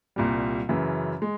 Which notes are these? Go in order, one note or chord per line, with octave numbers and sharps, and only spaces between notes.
C2 A#2 G3
F#2 C#3 E3
G#3